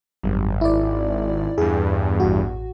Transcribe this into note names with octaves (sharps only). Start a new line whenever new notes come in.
G#1 F#2 G3
E4 D5
E2 G2 G#4
A1 F#4